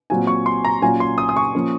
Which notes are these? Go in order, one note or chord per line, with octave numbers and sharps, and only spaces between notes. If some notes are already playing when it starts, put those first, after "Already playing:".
A#2 F#3 C4 F4 G#5
C#6
C6
A#5
A#2 F#3 C#4 F4 G#5
C6
D#6
D#6
C#6
F3 A#3 C#4